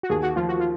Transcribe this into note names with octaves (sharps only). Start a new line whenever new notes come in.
F#4
D#2 G#4
F#4
F3 F4
F#4
F4